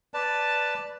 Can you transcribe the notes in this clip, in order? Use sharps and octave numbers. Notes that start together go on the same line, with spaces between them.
B4 D5 A5